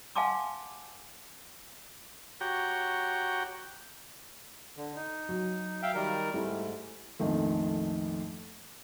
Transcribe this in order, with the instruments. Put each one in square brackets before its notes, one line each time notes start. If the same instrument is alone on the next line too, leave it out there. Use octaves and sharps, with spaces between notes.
[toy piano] F5 F#5 G#5 A5 C6 D6
[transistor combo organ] F#4 G4 C#5 G5 A#5
[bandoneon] D3
D#4
[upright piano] F#3
[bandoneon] E5 F5 G5
D#3 G3 A#4
[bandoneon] G#2 [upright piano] G3 A3 E4
[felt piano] A#1 F2 D#3 F3 A3